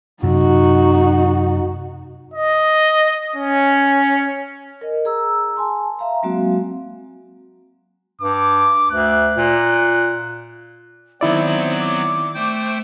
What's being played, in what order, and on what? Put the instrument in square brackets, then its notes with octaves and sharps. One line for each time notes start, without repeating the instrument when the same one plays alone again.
[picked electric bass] F#2 C3 [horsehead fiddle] D#4 F#4
[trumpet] D#5
C#4
[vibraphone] A#4 D#5
G#4 A#5 E6
G#5 A5 C6
E5 F5 A#5
F#3 G#3 A#3 C4 F#4
[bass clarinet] G2 [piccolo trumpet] D6
[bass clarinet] D2 [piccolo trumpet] F#6
[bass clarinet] A#2
[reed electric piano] D#3 E4 D5 [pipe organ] F#3 B3 C4 [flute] C5
[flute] D6
[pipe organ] A3 C5 G5